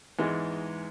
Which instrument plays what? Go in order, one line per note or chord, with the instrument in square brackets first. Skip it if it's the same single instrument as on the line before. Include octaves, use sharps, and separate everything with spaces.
[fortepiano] E2 G#2 G#3